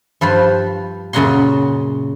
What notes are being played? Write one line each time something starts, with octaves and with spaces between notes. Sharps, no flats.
G2 F3 B4 C5
F#2 A#2 C#3 F#3 F#4 C6